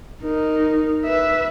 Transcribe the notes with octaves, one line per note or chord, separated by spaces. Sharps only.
D#4 A#4
B4 E5